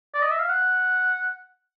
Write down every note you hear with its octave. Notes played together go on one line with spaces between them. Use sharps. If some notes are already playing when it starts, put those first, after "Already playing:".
D5
D#5
E5
F5
F#5